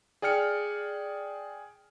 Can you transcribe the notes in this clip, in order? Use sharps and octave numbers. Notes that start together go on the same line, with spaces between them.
G#4 D5 G5 F6 C#7